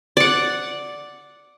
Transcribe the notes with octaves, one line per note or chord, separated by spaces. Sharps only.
D5 F#5